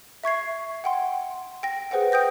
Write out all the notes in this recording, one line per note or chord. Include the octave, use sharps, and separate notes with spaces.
E5 C#6 G#6 C7
F#5 G5 C6
G5 A#6
G#4 B4 C5 F#5 G5
G5 D#6 G6 A#6